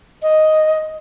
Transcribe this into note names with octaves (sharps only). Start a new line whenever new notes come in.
D#5